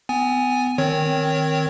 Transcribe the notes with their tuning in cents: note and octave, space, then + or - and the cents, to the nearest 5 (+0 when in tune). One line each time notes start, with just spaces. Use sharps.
B3 +30 G#5 -5
D#3 +0 C4 +0 C#5 +0